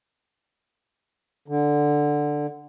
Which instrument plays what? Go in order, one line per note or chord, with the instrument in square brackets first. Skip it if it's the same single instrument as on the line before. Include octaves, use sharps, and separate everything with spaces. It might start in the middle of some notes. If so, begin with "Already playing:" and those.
[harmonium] D3